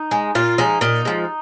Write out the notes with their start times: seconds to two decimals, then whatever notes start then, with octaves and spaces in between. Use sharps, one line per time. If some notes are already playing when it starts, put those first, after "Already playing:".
Already playing: D#4
0.11 G#3
0.35 A#2 F4
0.58 F3 G#3 D#4
0.81 A#2 D#4
1.05 F3 G#3